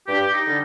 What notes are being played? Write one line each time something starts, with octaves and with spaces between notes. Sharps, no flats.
G2 G4
D#4
D3 G3